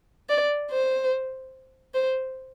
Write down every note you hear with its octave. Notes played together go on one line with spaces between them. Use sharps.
D5
C5
C5